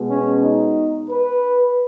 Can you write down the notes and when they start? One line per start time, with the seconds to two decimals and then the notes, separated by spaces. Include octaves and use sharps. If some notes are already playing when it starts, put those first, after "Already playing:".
Already playing: B2 G#3 B3
0.10 C#4
0.43 D#4
1.11 B4